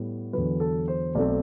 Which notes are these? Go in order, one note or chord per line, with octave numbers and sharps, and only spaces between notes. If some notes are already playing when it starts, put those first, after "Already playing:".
Already playing: A2 G3 B3
E2 D3 F#3 B4
A4
C5
B1 B2 F#3 A3 C4 D5